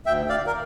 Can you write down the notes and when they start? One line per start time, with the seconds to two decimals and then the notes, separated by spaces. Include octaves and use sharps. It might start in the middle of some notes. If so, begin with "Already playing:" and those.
0.06 D2 E5 G5
0.29 D5 F5
0.46 A#4